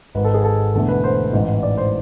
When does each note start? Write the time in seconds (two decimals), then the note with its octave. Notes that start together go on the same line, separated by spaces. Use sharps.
0.15 G#1 G#2 G#3 B4
0.24 A4
0.34 G#4
0.44 A4
0.74 E1 E2 D3 A3 A4
0.89 B4
1.04 C5
1.33 A1 G#2 E3
1.63 D5
1.78 C5